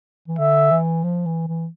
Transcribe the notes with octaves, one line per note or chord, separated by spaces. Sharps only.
E3
D3 E5
E3
F3
E3
E3